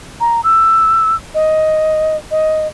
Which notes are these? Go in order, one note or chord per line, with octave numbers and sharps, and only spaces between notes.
A#5
E6
D#5
D#5